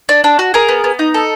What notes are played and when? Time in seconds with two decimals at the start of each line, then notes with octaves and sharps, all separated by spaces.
0.09 D4
0.24 D4
0.39 F#4
0.54 G#4 A#4
0.69 B3
0.84 B3
0.99 D#4
1.14 A4